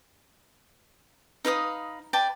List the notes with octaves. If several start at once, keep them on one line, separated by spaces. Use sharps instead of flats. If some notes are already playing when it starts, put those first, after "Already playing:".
D#4 B4 F5 D#6
B4 D5 G5 A5